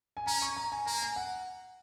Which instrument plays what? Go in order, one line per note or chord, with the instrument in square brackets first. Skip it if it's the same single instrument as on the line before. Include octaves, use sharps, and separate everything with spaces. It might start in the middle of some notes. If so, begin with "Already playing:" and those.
[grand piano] G#5
[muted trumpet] C#4 [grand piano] A#5
[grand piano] C#6
A#5
G#5
[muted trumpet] A#3 [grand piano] A#5
[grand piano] G#5
F#5